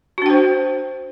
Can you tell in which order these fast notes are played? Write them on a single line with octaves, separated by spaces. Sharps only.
F#4 D4 G5 C5